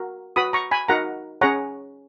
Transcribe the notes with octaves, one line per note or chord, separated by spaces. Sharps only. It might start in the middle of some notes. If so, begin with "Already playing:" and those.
Already playing: F#4 A#4
F#4 B4 B5 D#6
A#5 C#6
G#5 B5
D#4 F#4 A#4 F#5 A#5
C#4 G#4 C#5 F#5 A#5